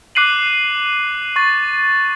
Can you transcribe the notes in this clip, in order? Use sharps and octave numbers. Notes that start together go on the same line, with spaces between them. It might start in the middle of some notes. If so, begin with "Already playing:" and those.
D6 F#6 C7 D#7 F#7
C#6 A6